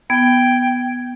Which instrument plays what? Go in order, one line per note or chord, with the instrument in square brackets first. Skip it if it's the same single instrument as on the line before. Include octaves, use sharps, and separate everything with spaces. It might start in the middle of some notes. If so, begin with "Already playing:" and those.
[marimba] B3 [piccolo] G5 [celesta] G#6